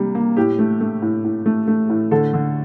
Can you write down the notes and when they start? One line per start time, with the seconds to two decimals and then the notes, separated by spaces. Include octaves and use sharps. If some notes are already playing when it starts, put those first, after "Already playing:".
Already playing: C3 G3 A#3
0.15 A#3
0.37 A2 G4
0.59 A3
0.81 A3
1.02 A2
1.24 A2
1.46 A3
1.68 A3
1.90 A2
2.11 D3 A4
2.33 D3